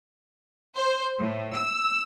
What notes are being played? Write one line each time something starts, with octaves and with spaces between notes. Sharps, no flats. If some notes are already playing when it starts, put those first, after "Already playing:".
C5
A2
E6